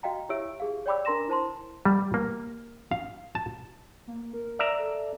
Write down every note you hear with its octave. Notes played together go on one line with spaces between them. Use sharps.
F#4 D#5 F5 G5 A#5
E4 G4 C#5 E5 E6 D7
G4 G#4 F5
C#5 D5 G5 B5 D6 E6
D4 A#4 A#5 C6 A#6 E7
E4 C5 A5 C6
G3
A#3
F5
A5
A#3
A#4
D5 E5 A#5
A4